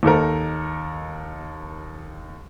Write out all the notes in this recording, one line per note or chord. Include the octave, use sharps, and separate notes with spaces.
D#2 D#4 A4 A#4